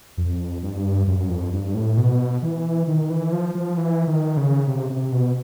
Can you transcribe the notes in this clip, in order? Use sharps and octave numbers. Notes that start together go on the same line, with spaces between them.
F2
G2
F#2
F2
G2
A2
B2
E3
D#3
E3
F3
F3
E3
D#3
C#3
C3
C3
B2